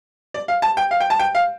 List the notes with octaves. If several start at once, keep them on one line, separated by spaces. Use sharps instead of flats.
D5
F5
A5
G5
F5
G5
A5
G5
F5